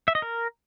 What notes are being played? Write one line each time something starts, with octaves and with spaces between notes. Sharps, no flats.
E5
D#5
A#4